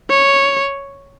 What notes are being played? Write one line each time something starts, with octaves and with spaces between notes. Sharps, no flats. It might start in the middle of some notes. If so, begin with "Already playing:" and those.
C#5